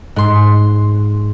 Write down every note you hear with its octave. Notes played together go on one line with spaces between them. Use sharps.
G#2 C6